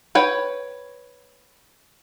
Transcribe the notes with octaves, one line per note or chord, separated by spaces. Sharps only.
B4 C#5 G5